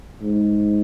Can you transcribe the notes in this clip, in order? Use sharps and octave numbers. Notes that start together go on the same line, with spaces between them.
G#2